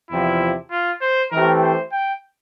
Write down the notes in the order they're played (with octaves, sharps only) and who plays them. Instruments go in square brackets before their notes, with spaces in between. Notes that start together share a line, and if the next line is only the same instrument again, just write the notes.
[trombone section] E2 C3 F3 [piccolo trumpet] E4
[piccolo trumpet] F4
C5
[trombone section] E3 A3 C4 G4 [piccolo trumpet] A#4
[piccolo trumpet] C5
G5